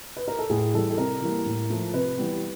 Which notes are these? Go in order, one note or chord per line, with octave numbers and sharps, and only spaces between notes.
B4
A#4
A4
A2 G#4
E3 G3 A4
A4
C3 A#4
E3 G3 A#3
A2
F3 A3
C3 B4
E3 G3 B3